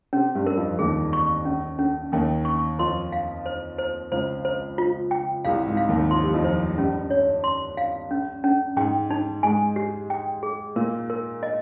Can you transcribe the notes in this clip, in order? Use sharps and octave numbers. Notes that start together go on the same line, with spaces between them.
C3 C4 C#4
G2 G3
A#4
F2 F3
D#2 D#3 G#4
C#6
C#4
C#4
D#2 D#3 G5
C#6
F2 F3 C6
F5
C5
C5
C#2 C#3 C5
C5
F4
G5
C2 C3 F5
G#2
F5
D#2 D#3
F3 C6
G3
F2 F3
C5
G2 G3 C#4
C#5
C6
F5
C#4
C#4
G#2 G#3 G5
D#4
G#2 G#3 G#5
G4
G5
G#4
A#2 A#3 A#4
A#4
D#5